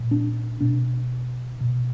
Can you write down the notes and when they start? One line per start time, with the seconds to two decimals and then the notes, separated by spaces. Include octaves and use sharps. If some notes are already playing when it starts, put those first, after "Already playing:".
Already playing: A#2
0.11 D4
0.61 B2 D4
1.61 B2